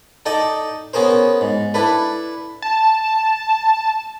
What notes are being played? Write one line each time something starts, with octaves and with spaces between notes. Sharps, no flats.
D#4 A4 D5 D#5 G5
B3 C#4 G#4 A#4 C5
G#2
D4 E4 A4 B4
A5